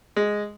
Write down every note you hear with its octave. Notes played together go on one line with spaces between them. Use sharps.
G#3